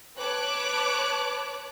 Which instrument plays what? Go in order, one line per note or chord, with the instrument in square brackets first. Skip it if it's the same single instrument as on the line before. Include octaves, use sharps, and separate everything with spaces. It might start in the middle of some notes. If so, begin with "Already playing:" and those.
[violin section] B4 C#5 A5 D6 F#6